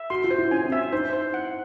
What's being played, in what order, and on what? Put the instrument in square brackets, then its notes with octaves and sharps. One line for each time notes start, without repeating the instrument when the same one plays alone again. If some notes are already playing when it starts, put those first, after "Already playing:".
Already playing: [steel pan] E5
[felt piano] F#4 [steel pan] C6
[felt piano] F4
[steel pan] C5
[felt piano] E4
[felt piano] C#4 [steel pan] G#5
[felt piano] C4
[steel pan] E5
[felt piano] D#4 [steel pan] C5
[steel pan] C5
F#5